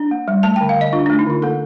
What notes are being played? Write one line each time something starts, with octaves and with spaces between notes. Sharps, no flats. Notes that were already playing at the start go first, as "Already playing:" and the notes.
Already playing: D4
A#3
G3
A3 A5
G5
D3
F5
D3 D#5
D4 F4
D4
A3
D#4
D3 F4
A#3 A4